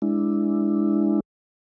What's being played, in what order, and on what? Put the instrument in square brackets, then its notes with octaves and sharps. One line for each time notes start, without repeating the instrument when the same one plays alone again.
[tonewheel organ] G#3 D4 E4